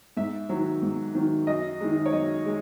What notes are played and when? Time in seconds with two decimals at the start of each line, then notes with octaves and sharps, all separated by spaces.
0.17 G#2 E5
0.49 D#3 F#3
0.82 G#2
1.15 D#3 F#3
1.47 F#2 D#5
1.81 D#3 G#3
2.06 C#5
2.12 F#2 D#5
2.46 G#3